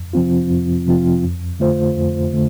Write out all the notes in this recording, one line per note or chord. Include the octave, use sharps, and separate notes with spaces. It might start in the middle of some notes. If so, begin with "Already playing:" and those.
Already playing: F2
C3 F3 C4 F4
F2
C3 F3 C4 F4
F2
D3 A3 F4 C5
F2
D3 A3